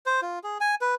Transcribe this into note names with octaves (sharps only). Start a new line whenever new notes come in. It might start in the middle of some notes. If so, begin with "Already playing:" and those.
C5
F4
G#4
G#5
B4